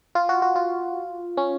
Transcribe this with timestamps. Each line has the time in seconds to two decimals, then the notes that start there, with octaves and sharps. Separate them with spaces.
0.15 F4
0.29 F#4
0.42 F#4
0.56 F4
1.37 C#4